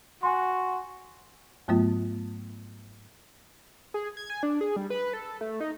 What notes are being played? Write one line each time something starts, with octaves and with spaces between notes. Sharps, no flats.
F#4 G#5 C6
G#2 F#3 A3 B3 F4
G#4
G#6
G#5
D4
G#4
G3
B4
A4
A3
D#4